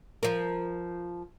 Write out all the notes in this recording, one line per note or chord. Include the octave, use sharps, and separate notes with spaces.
F3 A#4